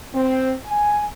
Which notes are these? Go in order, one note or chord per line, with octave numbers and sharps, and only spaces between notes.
C4
G#5